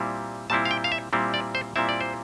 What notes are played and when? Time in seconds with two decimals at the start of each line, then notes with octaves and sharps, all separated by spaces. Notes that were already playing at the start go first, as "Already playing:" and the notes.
Already playing: A#2 G3 C4 E4
0.50 A#2 G3 C4 E4 A5
0.65 F5
0.71 G5
0.84 F5
0.92 E5
1.13 A#2 G3 C4 E4
1.34 D5
1.55 C5
1.76 A#2 G3 C4 E4 E5
1.89 D5
2.01 C5